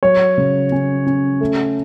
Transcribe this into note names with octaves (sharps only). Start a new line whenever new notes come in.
F#3 C#5
C#3
C#4
C#4
A3